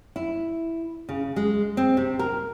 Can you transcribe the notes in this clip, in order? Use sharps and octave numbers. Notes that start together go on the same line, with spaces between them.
E4
C#3
G#3
C4
C3
A#4